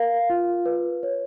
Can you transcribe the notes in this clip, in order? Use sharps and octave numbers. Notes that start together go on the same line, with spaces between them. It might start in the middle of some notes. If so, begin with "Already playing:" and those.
Already playing: A#4 F5
F4
B4
C#5